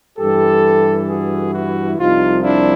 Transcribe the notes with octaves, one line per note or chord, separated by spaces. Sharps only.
G2 E3 G4 A4
F#4 G#4
E4 F#4
C2 C3 F3 D#4 F4
D4 E4